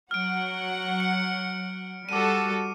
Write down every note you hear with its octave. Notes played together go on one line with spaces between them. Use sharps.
F#3 F#5 F6 D7
C#7
G3 F#4 A4 D6 D#7